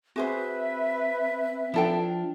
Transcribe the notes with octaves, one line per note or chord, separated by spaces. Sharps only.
C4 F#4 G#4 B4 C5 E5
F3 D4 E4 A4 G5